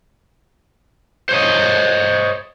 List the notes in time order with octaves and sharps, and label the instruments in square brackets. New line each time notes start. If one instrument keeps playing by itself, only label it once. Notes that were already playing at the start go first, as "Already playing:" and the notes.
[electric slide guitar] C5 C#5 D#5